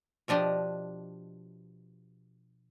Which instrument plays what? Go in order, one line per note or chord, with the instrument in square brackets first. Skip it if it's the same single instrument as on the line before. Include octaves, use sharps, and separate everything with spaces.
[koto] B2 F3 D4 G4 D#5